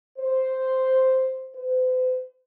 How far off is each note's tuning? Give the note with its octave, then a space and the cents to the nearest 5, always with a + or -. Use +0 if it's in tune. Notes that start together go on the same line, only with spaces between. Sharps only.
C5 +0
C5 -45